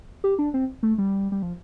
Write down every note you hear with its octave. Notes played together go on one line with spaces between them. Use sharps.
G4
D4
C4
A3
G3
G3
F3